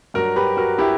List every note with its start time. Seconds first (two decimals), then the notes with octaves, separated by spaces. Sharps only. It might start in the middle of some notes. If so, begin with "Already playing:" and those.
0.14 G2 F#3 F#4 A#4
0.36 G4 B4
0.57 F#4 A#4
0.78 E4 G4